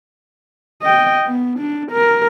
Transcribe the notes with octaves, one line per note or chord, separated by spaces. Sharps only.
D#5 G5
B3
D4
A#4